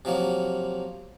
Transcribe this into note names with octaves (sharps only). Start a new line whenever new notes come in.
C3 F3 F#3 A#3